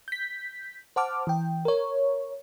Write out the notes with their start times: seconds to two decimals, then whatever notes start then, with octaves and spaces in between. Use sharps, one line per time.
0.08 G6 B6
0.96 C5 F#5 A5 D6 F6
1.27 E3 G5
1.65 A#4 C#5